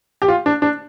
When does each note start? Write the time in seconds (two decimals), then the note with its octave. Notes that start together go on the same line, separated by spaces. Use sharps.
0.22 G4
0.28 F4
0.46 D4
0.62 D4